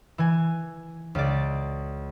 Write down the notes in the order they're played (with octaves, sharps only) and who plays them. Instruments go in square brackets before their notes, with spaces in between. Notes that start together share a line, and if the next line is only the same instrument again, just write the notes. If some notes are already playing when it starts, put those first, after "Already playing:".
[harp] E3 G#5
C#2 D5